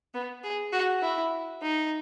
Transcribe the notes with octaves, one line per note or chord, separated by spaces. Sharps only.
B3
G#4
F#4
E4
D#4